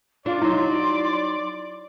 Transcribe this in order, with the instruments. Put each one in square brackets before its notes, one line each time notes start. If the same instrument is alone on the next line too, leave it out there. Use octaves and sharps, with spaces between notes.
[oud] D4 [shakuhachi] F4 [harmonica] D5
[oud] F#3 D#4 [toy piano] E4 [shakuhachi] C6